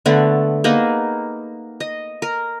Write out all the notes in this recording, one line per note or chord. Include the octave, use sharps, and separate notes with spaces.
D3 A3 B3
A#3 B3 D#4 G#4
D#5
A#4